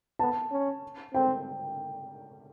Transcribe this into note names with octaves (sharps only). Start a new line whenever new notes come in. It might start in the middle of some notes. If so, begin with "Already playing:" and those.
B3 A5
C#4
C4 G5